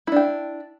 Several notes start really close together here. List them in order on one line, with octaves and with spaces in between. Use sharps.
E4 D4 G5